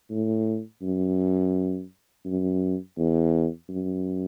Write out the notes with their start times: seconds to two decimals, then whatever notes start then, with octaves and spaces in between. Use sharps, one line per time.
0.10 A2
0.82 F#2
2.26 F#2
2.98 E2
3.69 F#2